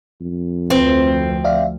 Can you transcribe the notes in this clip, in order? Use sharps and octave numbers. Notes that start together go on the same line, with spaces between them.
F2
D2 F3 C4 B4
D5 E5 F5